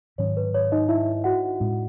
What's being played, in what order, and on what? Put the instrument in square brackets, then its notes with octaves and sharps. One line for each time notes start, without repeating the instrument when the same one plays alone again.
[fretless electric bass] G#2 D#3 F#3 C#4 [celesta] C#5
[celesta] B4
C#5
D#4 D#5
E4 E5
F#4 F#5
[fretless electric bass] A2 G#3 C#4